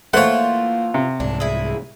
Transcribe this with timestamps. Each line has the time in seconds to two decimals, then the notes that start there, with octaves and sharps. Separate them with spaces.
0.14 E3 A3 A#3 F4 C5 C#5 F#5
0.94 C3
1.20 C2 G#2 D4
1.40 E4 G#4